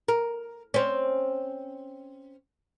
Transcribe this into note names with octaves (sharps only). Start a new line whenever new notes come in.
A#4
C4 C#4